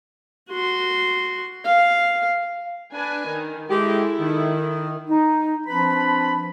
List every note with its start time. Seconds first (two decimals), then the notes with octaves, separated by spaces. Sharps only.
0.50 F#4 C6
1.65 F5
2.94 D4 B4 G#5
3.28 D#3
3.70 G#3 E4 G4 A4
4.20 D#3
5.07 D#4
5.67 F3 C4 D4 B4 B5